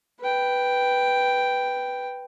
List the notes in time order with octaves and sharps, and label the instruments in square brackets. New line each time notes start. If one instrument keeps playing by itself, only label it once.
[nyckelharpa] B4 G5